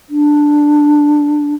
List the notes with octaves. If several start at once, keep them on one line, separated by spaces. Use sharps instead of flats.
D4